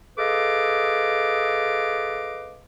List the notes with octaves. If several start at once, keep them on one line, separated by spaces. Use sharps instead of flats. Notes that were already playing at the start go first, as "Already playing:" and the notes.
G#4 A4 B4 D#5 F5 D6